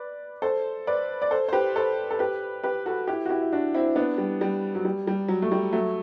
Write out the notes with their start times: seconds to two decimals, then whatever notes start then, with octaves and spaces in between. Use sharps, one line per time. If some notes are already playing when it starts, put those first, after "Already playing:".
Already playing: B4 D5
0.42 A4 C5
0.87 B4 D5
1.22 D5
1.31 A4 C5
1.48 C5
1.53 G4 B4
1.76 A4 C5
2.11 A4
2.19 G4 B4
2.64 G4 B4
2.86 F#4 A4
3.08 E4 G4
3.26 F#4
3.29 E4 G4
3.42 E4
3.53 D4 F#4
3.74 C4 E4
3.96 B3 D4
4.18 G3
4.41 G3
4.75 F#3
4.85 G3
5.07 G3
5.28 F#3
5.42 A3
5.52 G3
5.73 F#3 A3